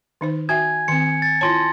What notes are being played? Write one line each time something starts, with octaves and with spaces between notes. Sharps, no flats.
D#3 D#4 C5
F#4 E5 G5 G#5 G#6
D#3 C4 C#7
A6
E4 F4 C#5 A5 C6 A#6